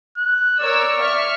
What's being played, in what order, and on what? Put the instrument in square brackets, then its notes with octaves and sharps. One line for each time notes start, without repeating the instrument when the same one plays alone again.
[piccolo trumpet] F#6
[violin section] A#4 C#5 E6 [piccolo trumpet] D5
[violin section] E5 C#6 F6